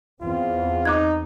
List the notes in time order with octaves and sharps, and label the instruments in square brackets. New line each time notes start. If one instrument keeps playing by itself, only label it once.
[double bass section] E2 C4 [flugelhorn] F4
[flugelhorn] D#4 [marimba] D6 F#6 G#6